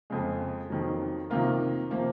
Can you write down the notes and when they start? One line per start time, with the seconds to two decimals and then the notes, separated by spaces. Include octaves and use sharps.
0.10 F2 C#3 G#3
0.70 F2 D#3 F#3
1.30 C3 D#3 A#3 F4 A#4
1.90 C3 F3 A#3